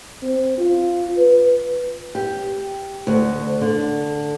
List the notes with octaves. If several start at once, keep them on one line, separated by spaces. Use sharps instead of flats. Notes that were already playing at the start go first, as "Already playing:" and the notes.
C4
F4
B4
G4
D2
D3